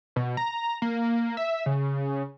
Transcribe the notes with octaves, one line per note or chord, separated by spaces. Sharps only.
B2
A#5
A#3
E5
C#3